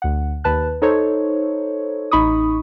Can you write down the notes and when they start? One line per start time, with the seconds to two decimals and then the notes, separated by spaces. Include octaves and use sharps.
0.02 D2 F#5
0.44 D#2 B4 A5 F#6
0.82 D#4 A4 C5 C#5
2.11 A1 D#4 B5 C#6 D#6